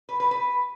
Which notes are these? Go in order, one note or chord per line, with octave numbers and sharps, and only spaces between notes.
B4
B4
B4